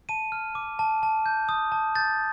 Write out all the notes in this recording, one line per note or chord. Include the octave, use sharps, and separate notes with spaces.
A5 D#7
F6
D6
A5
A5
G6
D#6
A5
G6 A6